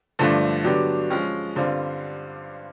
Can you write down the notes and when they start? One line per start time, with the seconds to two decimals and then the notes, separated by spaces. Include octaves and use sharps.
0.19 G2 D3 F3 A3 D4
0.64 D3 F#3 B3 D4 G4
1.10 F3 G#3 C#4
1.56 G2 D3 G3 C4 F4